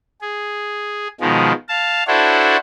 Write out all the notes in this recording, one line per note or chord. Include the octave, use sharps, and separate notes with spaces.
G#4
B2 D#3 F3 G#3
F5 A5
D4 E4 F#4 A4 C5 C#5